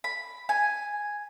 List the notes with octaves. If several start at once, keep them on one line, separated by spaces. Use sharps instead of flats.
B5
G#5